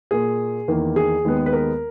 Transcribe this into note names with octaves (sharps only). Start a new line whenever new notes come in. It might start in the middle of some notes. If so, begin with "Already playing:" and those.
A#2 A#3 G#4
E2 D#3 A#3
G#4
D#2 D#3 G#3 B3
B4
A#4